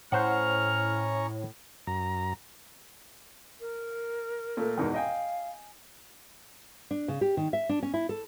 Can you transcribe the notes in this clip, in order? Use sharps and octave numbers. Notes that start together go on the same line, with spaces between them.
A2 C#4 C5 F#5 A#5 C#6 F6
F#2 A#5
A#4
A#2 A3
E2 G#2 B2
D#5 F5 G5 G#5
D4
C#3
G4
D#3
E5
D4
C#4
E4
A4